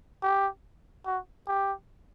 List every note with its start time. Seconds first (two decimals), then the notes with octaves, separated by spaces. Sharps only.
0.23 G4
1.06 F#4
1.48 G4